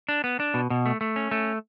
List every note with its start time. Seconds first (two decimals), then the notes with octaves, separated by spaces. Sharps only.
0.09 D4
0.24 B3
0.40 D4
0.54 B2
0.70 B2
0.86 A3
1.01 A3
1.16 C#4
1.31 A3